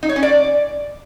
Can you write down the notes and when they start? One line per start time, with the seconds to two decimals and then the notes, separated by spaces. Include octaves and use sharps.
0.03 D#4
0.09 C#5
0.16 C#4
0.23 D5